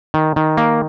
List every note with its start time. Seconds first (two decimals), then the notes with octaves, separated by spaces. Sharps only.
0.14 D#3
0.36 D#3
0.57 A#3